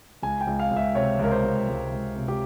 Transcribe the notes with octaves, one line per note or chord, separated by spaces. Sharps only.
C#2 G#5
G5
C#2
F5
C#2
E5
C3 C#5
C#2
A#4
C5
C#2
C#2
C#2
C3
G4